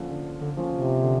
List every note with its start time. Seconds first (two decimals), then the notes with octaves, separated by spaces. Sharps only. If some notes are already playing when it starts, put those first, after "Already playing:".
Already playing: D3 F3 A#3 C#4 F4
0.11 D3
0.41 D3
0.57 F3 A#3 C#4 F4
0.72 C3
1.03 D3